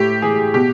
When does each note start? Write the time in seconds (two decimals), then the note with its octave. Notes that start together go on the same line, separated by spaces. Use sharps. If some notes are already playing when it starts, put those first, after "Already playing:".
Already playing: A2 G4
0.22 E3 G#4
0.54 B2 G4